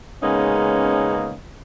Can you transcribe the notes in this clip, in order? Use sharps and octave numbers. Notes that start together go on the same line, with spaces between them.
C#3 G#3 A#3 B3 C#4 D#4